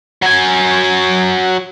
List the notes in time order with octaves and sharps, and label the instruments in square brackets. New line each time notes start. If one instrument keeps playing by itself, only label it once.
[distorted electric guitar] F#3 G#5